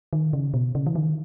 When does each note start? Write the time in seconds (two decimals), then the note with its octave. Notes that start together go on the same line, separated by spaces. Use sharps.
0.13 D#3
0.33 C#3
0.54 B2
0.75 C#3
0.87 E3
0.95 D#3